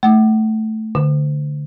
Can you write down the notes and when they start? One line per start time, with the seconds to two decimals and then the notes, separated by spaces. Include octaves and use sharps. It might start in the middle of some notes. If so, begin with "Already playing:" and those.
0.03 A3
0.95 D3